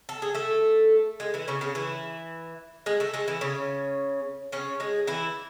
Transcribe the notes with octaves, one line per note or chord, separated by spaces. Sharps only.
A4
G#4
A3 A4
G#3 G#4
E3 E4
C#3 C#4
C#3 C#4
E3 E4
G#3 G#4
A3 A4
G#3 G#4
E3 E4
C#3 C#4
C#3 C#4
G#3 G#4
E3 E4